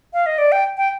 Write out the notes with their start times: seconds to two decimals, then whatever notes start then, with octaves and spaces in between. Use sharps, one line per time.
0.13 F5
0.26 D#5
0.38 D5
0.52 G5
0.77 G5